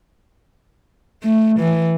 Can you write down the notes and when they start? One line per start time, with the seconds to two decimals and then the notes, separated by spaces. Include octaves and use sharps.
1.23 A3
1.59 E3